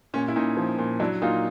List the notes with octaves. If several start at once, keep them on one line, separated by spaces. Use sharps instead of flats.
A#2 C#4
E4
A#2 C#4 D#4
F3
A#2
F#3 D4 E4
A#2 D#4 F4